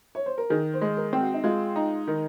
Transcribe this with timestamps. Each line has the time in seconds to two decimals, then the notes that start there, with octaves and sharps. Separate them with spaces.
0.15 C#5
0.26 C5
0.38 A#4
0.50 D#3 G#4
0.74 C5
0.81 G#3
0.97 A#4
1.13 C4
1.21 F#4
1.34 D#4
1.44 G#3 F4
1.76 D#4
2.07 D#3